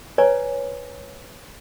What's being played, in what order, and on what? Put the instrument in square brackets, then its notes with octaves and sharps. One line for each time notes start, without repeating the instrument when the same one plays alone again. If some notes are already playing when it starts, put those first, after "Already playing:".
[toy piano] B4 C#5 D5 G#5 A#5